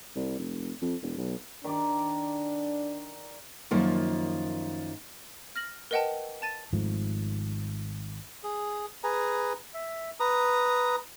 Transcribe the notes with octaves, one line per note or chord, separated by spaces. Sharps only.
C2
F1
F2
E1
B1
D#3 D4 D5 D6
F#2 D#3 F3 A#3 F4
F6 A#6 F#7
A#4 B4 D#5 F#5 G5 A5
A5 A6 D#7
G#1 G#2 F3 A3
G#4
G#4 B4 G#5 A#5
E5
B4 A#5 D#6